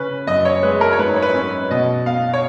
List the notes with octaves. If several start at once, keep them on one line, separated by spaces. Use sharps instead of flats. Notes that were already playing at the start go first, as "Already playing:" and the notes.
Already playing: C#3 C#4 B4
F#2 D#5
C#5
G#3 B4
A#4
C#5
G#2 B4
C#5
B4
C#4
B2 D#5
B3 F5
C#5